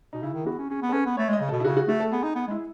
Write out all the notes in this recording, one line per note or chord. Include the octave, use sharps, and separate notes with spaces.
B2 D#4
C#3 E4
D#3
B3 F#4
C#4
C#4 G#4
B3
A4
C#4 B4
B3
A3 C#5
G#3
D#5
C#3
B2 A4
E4
C#3 F#4
F#4
A3 F#4
A4
B3 G#4
D#4
B3
G#3
E4